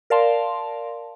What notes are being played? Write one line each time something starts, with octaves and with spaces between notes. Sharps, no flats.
A#4 D5 F5 A5 C6